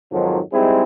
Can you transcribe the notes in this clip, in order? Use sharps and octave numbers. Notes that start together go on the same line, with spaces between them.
F2 G#2 D#3 F3 F#3
G3 G#3 C4 D#4 E4 G#4